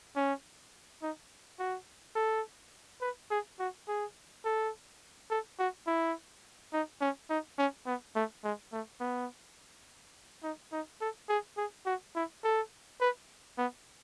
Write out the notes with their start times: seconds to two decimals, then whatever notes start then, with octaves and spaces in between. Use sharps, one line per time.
0.16 C#4
1.02 D#4
1.59 F#4
2.16 A4
3.01 B4
3.31 G#4
3.59 F#4
3.88 G#4
4.45 A4
5.30 A4
5.59 F#4
5.87 E4
6.73 D#4
7.01 C#4
7.30 D#4
7.58 C#4
7.86 B3
8.15 A3
8.44 G#3
8.72 A3
9.00 B3
10.43 D#4
10.72 D#4
11.01 A4
11.29 G#4
11.57 G#4
11.86 F#4
12.15 E4
12.44 A4
13.01 B4
13.58 B3